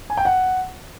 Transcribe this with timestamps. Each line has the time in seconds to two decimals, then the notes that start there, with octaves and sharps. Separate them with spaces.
0.10 G#5
0.17 G5
0.25 F#5